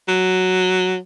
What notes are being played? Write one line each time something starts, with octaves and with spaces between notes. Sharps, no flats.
F#3